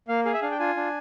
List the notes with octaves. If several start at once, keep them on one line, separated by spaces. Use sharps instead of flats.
A#3 F5
G#4 F5
E5
D4 F5
G5
F4 G#5
D4